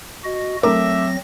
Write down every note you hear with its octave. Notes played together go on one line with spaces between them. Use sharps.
F#4 D#5
F#3 A3 C4 A#4 E5 D6 A#6